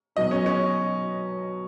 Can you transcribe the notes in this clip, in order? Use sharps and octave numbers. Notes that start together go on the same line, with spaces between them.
B2 F#3 D#4 B4 D#5
C#4
C#4